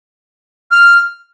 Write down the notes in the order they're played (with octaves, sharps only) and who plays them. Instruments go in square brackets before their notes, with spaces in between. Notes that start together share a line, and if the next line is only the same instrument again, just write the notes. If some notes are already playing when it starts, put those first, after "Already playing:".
[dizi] F6